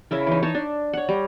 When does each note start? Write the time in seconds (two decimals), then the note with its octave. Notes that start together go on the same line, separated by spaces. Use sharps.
0.11 C#3 E4 A#4
0.27 E3 D#4
0.43 D#4 C#5 A5
0.55 D4
0.93 C#5 F#5
1.09 G3 A#5